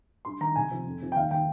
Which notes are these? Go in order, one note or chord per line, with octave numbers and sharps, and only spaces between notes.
G2 C6
D#3 A#5
C2 G#5
C3 F3
F2
C3 F3
G5
D#2 F5
D#3 G5